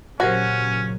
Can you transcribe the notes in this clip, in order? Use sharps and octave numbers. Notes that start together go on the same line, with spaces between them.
A#2 C#3 F#3 C#4 F#4 G4 A#4 C5